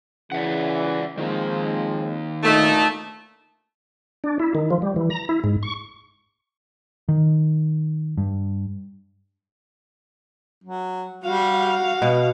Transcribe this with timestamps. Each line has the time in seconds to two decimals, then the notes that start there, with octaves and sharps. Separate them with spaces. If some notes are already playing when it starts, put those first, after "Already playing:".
0.32 C#3 E3 D5 E5 F#5
1.18 D#3 F3 G#3 A#3 C4
2.43 D2 A#2 A3 D#4
4.24 D4
4.40 E4
4.55 D#3
4.71 F3
4.82 G3
4.96 E3
5.10 A#5
5.29 E4
5.44 G#2
5.63 C#6
7.09 D#3
8.18 G2
10.64 F#3
11.24 G3 F#4 F5
12.02 B2 B3